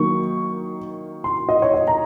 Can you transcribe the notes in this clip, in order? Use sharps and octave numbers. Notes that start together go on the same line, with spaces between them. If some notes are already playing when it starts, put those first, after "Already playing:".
Already playing: D#3 F#3 A#3 C#6
C6
D#5
C#5
D#5
A#5